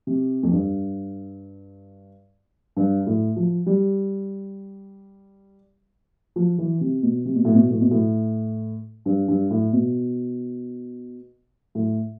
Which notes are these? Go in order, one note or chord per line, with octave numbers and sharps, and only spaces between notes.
C3
F2
G2
G2
A2
F3
G3
F3
E3
C3
B2
C3
B2
A2
B2
A2
B2
A2
G2
G2
A2
B2
A2